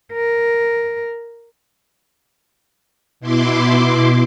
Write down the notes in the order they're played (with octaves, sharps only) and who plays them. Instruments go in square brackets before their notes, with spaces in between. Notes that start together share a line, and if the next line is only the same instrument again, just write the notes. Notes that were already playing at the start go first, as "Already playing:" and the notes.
[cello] A#4
[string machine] B2 E4 C6 D6